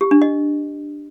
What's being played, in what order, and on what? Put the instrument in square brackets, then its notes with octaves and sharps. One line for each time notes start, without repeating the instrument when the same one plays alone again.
[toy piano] G4
D4
D#5